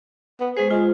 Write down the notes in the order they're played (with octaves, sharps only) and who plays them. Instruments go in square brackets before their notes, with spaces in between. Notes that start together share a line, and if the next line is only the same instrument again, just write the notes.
[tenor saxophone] B3
[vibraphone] G#3 C5 [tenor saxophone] G#4
[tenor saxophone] G#3 [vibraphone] F4